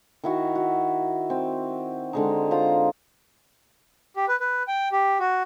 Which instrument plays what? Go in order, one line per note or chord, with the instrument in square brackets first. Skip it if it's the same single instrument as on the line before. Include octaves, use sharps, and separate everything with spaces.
[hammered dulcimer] D#3 E4 F#4
F#4
C4
D3 G#3 D#4
F4 C5 A#5
[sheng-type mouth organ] G4
B4
B4
G5
G4
F#4